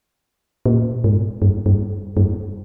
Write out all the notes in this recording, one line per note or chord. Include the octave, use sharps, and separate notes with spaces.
A#2
G#2
G2
G2
G2